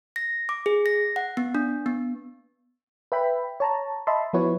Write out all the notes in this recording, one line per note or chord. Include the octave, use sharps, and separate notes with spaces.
A#6
D6
G#4
A#6
F#5
B3
D4
B3
B4 E5 G5 B5
C#5 A5 A#5
D#5 E5 A5 B5 C6
F3 B3 E4 F#4 B4 C#5